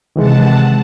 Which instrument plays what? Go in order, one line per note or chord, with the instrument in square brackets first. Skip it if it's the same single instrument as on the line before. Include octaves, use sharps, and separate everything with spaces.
[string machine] C3 F#5 A5 [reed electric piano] D#3 E3 G#3